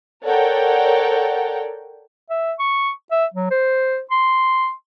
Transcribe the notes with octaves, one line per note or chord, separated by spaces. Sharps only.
A4 A#4 C#5 D5 F#5 G5
E5
C#6
E5
F#3
C5
C6